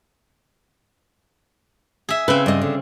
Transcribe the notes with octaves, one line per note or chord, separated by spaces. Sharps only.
G#4 E5
C#3 C4 B4
G2 D#5
D3